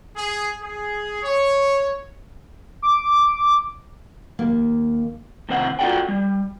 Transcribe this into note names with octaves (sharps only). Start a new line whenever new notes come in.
G#4
G#4
C#5
D6
D#2 A#3
A2 C3 D#3 C5 D5 F#5
F4 F#4 A4 D5 F#5 G5
G3